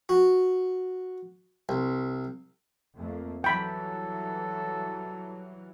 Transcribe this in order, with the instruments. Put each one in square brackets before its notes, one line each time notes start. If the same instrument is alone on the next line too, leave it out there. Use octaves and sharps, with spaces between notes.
[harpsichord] F#4
C2
[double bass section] F2 A3 A#3
[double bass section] E3 F#3 G3 [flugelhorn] A4 [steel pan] G5 B5